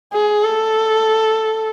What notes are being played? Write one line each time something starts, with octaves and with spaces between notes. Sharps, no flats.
G#4
A4